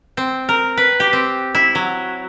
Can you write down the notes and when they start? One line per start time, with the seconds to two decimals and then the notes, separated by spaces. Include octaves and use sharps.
0.17 C4
0.49 A#4
0.77 B4
1.00 G4
1.13 C4
1.55 E4
1.75 F#3